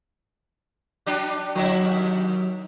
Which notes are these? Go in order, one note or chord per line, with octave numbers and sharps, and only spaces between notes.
F#3 D4
D3 F#3 E4 E5
D#2